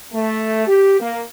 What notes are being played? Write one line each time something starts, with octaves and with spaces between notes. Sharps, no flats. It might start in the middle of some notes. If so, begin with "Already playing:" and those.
A3
G4
A#3